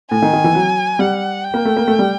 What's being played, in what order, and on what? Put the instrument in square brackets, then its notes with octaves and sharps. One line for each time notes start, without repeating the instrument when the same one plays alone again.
[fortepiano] A2 [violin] G#5
[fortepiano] D#3
D#3
E3
F#3
[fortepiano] G3 [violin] F#5
[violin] G5
[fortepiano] A#3
A3
A#3
A3
G3